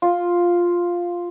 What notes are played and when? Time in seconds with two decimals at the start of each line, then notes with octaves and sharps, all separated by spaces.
0.02 F4